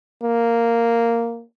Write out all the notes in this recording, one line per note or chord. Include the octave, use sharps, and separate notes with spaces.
A#3